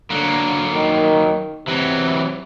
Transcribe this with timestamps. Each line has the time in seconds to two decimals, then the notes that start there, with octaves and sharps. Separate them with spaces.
0.10 D3 F#3 A#3
0.73 D#3
1.68 C3 E3 F#3